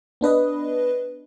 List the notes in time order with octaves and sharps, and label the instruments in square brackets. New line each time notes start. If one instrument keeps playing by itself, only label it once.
[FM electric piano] B3 D4 B4 D#5